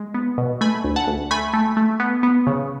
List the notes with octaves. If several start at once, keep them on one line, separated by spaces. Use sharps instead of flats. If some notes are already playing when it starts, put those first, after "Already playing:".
Already playing: G#3
B3
B2
A3 G#5 B5
D2
F#5 A5
D2
A3 G#5 B5
A3
A3
B3
B3
C#3